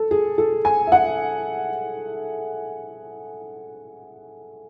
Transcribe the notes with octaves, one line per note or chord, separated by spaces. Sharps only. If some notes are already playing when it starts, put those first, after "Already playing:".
Already playing: A4
G#4
A4
G#5
E5
F#5